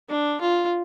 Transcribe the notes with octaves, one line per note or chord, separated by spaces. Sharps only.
D4
F4